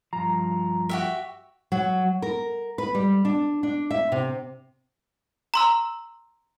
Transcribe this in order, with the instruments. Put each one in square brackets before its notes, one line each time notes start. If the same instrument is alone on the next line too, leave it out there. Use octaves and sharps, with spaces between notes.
[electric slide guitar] G2 F3 [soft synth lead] A#5
[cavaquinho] F#4 G4 E5
[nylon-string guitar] F#3
A#4
B4
G3
D4
D4
E5
C3
[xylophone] A#5 C6 E6